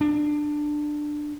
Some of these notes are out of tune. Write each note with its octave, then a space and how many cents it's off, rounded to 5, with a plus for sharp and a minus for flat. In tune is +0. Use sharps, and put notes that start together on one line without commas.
D4 +15